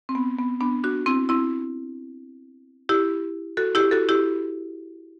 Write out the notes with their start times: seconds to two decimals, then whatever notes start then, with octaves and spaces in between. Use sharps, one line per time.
0.09 C4
0.15 B3
0.39 B3
0.61 B3 D4
0.84 D4 F#4
1.06 C4 E4
1.29 C4 E4
2.89 E4 G4
3.57 F#4 A4
3.75 E4 G4
3.91 F#4 A4
4.09 E4 G4